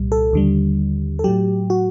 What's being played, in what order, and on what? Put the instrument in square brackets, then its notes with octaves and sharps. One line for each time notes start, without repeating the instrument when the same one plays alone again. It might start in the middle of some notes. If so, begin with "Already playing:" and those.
Already playing: [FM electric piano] C2 A#2 G3
A4
D#2 D3 G3
A4
A2 F#3 G4
F#4